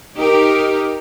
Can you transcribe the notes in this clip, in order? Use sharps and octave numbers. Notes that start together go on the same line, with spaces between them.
D#4 G4 A#4